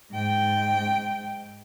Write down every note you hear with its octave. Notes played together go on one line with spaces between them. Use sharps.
G#2 G5